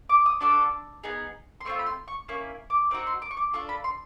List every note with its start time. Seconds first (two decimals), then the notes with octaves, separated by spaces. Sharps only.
0.10 D6
0.26 D#6
0.41 D4 F#4 A4 D6
1.04 B3 D#4 G#4
1.61 C6
1.65 A3 C4 F4 C#6
1.79 B5
1.86 C6
2.08 C#6
2.28 A#3 C#4 E4 C#6
2.70 D6
2.91 C4 D#4 F#4 D6
3.07 C6
3.22 D6
3.31 C#6
3.37 D6
3.53 D4 F4 A4 C#6
3.69 B5
3.84 C6